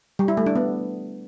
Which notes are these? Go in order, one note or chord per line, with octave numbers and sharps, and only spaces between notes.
G3
E4
A3
D4
B3